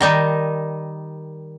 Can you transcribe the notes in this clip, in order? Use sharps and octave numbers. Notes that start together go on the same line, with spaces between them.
D#3 G3 D#4